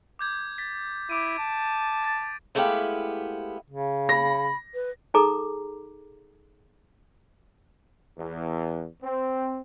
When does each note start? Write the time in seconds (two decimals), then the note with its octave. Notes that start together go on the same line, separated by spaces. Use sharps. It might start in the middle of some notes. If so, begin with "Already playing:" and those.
0.19 D6 G6 G#6
0.58 A6 B6
1.10 E4 D6 D7 D#7
1.39 A5
2.04 A6
2.55 G#3 A3 B3 E4 G4 F5
3.70 C#3
4.09 B5 A#6
4.74 B4
5.14 D#4 G#4 A4 A#5 D6
8.18 E2
9.03 C4